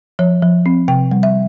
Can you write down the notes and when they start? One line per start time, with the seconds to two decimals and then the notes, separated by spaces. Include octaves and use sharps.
0.19 F3 C#5
0.42 F3
0.66 C4
0.88 C3 G5
1.11 G3
1.23 E5